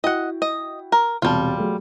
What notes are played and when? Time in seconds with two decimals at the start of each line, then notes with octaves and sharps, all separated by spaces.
0.04 E4 F#4 D#5 F#5 G5
0.42 D#5
0.92 A#4
1.22 E1 C3 G3 F4 A5
1.58 F#3 A3 G#4